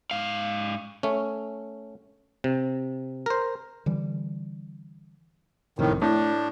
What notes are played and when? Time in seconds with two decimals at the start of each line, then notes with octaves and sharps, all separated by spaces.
0.11 G#2 F5
1.03 A3 C#4
2.44 C3
3.26 A#4 C5
3.86 D3 E3 G3
5.79 F#1 F2 A2 C3 D#3
6.02 A2 A3 D4